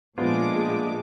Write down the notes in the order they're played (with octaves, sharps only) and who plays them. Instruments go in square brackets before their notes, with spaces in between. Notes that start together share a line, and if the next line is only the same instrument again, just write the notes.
[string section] A#2 G#3 D6 [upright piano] F3 B3 [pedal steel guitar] A3 D4 F4